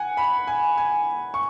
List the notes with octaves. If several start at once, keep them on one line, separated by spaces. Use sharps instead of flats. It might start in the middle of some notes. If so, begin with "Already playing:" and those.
Already playing: F#5 G#5
B5
G#5
G#5
C#6